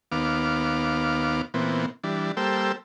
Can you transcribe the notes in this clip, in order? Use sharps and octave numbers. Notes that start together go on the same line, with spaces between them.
D#2 B3 F5 D6
A#2 E3 B3 C4
E3 G3 D4
G3 A#3 A4 C5 G5 E6